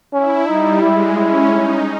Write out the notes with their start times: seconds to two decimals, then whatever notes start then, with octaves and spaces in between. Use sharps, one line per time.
0.13 C#4 E4
0.48 G3 D#4
0.82 G#3 E4
1.17 C#4 E4
1.51 D#4